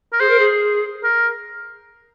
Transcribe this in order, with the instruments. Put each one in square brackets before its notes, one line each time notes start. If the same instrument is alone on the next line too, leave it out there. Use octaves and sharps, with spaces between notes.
[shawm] A#4
[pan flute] G#4 [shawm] C5
[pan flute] A#4
G#4
[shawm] A#4